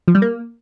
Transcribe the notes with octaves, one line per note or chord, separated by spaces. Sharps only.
F3
G3
A#3